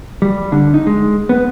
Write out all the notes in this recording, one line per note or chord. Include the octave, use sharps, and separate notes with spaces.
G3
D3
D#4
G#3
B3